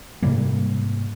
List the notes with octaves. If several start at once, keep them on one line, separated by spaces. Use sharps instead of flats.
G#2 C3 G3 A#3